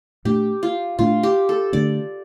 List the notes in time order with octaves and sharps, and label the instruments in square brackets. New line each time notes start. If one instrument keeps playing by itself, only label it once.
[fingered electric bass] A#2 A3 D4 [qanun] G4
[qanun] F4
[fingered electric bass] A#2 A3 D4 [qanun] F4
[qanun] G4
A4
[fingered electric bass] D3 A3 D4 [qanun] D5